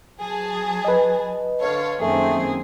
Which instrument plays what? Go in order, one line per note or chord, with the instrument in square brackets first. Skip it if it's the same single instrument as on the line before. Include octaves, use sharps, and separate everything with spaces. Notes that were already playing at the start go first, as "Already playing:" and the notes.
[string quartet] F#3 [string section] G#4 A5
[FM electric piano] B4 D#5
[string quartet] D3 [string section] A4 C#5 F5
[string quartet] F#2 A#3 G#4 [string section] D#3 C4 [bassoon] A3